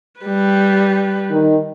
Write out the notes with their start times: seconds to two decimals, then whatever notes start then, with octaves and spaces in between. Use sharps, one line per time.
0.21 G3 B4
1.29 D#3